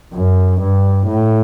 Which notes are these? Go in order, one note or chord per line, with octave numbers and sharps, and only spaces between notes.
F#2
G2
A2